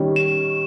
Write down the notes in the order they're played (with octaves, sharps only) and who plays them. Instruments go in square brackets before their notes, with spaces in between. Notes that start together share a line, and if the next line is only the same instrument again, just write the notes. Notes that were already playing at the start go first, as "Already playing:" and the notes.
Already playing: [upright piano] D#3 G3 C#4
[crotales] E7